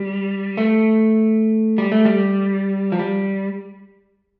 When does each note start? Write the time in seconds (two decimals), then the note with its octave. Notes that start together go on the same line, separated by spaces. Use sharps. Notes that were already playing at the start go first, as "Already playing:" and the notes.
Already playing: G3
0.57 A3
1.78 G3
1.92 A3
2.05 G3
2.92 F3
2.99 G3